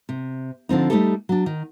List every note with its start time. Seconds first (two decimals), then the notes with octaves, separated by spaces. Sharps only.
0.09 C3
0.69 D3 F3 C4 D#4
0.90 G3 A3 C4 D#4 G4 A4
1.29 F#3 D4
1.46 D#3